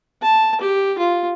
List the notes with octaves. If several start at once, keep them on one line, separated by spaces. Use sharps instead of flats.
A5
G4
F4